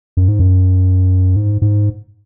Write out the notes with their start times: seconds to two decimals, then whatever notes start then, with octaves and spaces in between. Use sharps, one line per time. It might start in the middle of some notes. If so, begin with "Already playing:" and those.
0.17 F#2
0.28 G#2
0.40 F#2
1.36 G#2
1.62 G#2